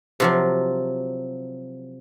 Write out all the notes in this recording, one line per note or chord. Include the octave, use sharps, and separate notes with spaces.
C3 F3 F#3